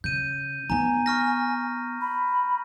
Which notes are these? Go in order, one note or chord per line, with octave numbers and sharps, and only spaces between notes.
C#3 G6 D#7
B3 D#4 G#5 A#5
C#6 F6 A#6
B5